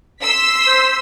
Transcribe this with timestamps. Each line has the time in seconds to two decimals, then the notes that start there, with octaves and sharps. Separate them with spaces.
0.22 C6 E6 B6
0.67 C5